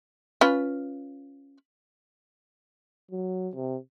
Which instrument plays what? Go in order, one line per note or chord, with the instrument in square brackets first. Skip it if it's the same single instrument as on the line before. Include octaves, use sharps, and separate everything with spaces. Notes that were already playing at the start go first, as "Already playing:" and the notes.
[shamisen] C#4 F4 B4
[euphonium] F#3
C3